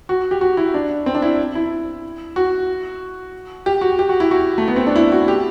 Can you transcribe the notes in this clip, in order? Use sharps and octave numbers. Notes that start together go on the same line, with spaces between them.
F#4
G4
F#4
E4
D4
C4
D4
E4
E4
F#4
G4
F#4
G4
F#4
E4
F#4
A3
B3
C4
D4
E4
F#4
G4